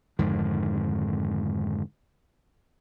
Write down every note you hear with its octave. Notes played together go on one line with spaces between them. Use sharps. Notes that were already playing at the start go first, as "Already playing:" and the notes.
F2 G#2 D3 D#3